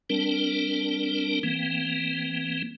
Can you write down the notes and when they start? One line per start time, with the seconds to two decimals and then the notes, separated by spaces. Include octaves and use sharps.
0.10 G3 C4 D4 A#4
1.43 E3 A#3 C4